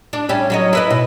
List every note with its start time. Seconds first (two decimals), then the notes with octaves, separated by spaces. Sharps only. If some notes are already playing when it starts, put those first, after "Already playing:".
0.13 D4
0.29 G3 C#4 E5
0.50 F#3 C#4 D#5
0.73 E4 B4 D#5
0.90 B2